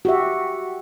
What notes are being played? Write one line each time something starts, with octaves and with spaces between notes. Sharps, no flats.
F#4 G4 E5